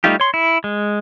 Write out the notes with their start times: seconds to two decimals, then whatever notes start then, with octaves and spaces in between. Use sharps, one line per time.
0.04 G3 A3 D#4 F4 G4
0.20 C#5 C6
0.34 E4
0.64 G#3